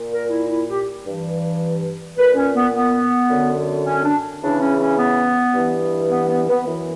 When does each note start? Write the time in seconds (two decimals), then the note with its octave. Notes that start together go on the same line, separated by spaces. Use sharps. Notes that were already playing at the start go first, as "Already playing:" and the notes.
Already playing: A#2
0.12 A#4
0.30 E4
0.49 E4
0.68 G4
1.06 G2 E3
2.17 A#2 B4
2.36 C#4
2.55 B3
2.74 B3
3.29 F#2 D3
3.86 C#4
4.04 D4
4.42 E2 C#3 E3 D4
4.60 C#4
4.79 C#4
4.98 B3
5.54 G2 E3
6.10 B3
6.29 B3
6.48 B3
6.66 F#2 E3